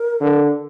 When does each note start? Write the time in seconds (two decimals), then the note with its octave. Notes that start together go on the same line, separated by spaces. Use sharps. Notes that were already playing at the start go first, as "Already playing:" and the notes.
Already playing: A#4
0.21 D3